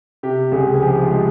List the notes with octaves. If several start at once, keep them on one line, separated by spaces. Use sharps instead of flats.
C3 G4
C#2 G#4
G#4
F3 G4
F4
G#3